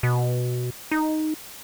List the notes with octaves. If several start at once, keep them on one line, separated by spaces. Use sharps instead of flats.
B2
D#4